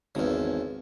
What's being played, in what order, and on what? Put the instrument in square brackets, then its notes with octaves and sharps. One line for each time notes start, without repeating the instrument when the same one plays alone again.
[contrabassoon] G#1 [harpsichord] E2 C#3